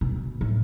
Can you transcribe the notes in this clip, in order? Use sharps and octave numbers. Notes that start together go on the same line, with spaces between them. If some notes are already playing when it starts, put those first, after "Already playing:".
B2
A2